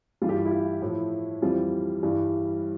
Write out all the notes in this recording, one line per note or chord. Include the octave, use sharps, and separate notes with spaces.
G2 E3 G3 F4
G4
F4
E4
F4
A2 F3 E4
F2 E3 G3 F4
G2 E3 G3